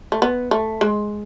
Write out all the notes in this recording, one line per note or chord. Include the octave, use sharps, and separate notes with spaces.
A3
B3
A3
G#3